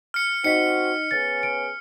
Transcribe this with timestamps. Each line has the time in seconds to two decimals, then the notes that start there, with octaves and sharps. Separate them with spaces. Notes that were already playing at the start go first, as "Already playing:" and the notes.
0.14 F6 C#7
0.44 C4 D#4 F#4 D#5 B6 C#7
1.11 B3 C#4 G#4 A6
1.43 D7